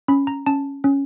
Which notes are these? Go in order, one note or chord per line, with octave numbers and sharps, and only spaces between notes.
C#4 B5
A#5
C#4 A5
C#4